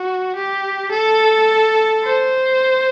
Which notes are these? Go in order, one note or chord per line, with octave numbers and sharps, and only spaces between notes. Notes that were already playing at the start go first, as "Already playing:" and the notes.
Already playing: F#4
G4
A4
C5